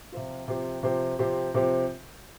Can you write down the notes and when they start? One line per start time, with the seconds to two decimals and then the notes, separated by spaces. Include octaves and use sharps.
0.12 C3 F3 C4 F4
0.48 C3 F3 C4 G4 C5
0.83 C3 F3 C4 G4 C5
1.19 C3 F3 C4 G4 C5
1.54 C3 F3 C4 G4 C5